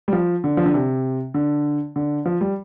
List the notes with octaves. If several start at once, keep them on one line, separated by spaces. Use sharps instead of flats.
G3
F3
D3
F3
D3
C3
D3
D3
F3
G3